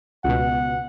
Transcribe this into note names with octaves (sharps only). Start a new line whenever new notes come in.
C#2 B2 F#5